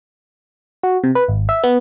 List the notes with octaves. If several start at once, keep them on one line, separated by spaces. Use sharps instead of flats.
F#4
C3
B4
G#1
E5
B3